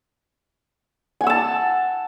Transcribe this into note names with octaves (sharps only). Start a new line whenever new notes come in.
F#5 G#5 A5 E6